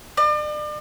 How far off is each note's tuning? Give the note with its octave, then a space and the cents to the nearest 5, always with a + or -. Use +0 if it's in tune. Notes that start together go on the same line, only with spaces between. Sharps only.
D5 +40